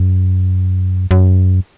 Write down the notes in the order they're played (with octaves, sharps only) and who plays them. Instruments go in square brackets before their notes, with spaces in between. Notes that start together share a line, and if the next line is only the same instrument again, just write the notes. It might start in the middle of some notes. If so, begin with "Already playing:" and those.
Already playing: [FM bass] F#2
F#2